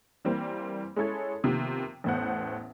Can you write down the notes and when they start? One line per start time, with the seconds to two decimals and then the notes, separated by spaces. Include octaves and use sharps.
0.25 E3 G3 A#3 C4
0.96 G#3 C#4 E4 A4 C#5 G#6
1.44 C3 D#3 F3 A#3 B3
2.04 A1 E2 A2 B3 C5 F#5